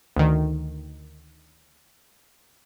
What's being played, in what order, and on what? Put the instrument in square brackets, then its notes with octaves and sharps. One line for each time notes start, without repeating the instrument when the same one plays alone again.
[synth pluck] D2 D#3